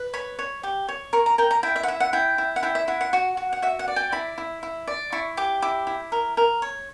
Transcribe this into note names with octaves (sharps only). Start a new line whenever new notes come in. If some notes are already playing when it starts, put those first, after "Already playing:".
Already playing: B4
C#5 B5
C#5
G4
C#5
A#4 C#6
A#5
A#4 G5
A#5
E4 G5
E5
F#5
E4 E5
F#5
E4 G5
E4
F#5
E4 G5
E5
E4 F#5
F#5
F#4 F#5
F#4
F#5
F#4 E5
F#5
D5
G5
E4 B5
E4
E4
D5
E4 C#6
G4 D6
E4 D6
E4
A#4
A#4
C#5